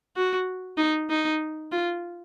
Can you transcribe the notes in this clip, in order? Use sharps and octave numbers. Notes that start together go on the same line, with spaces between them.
F#4
D#4
D#4
F4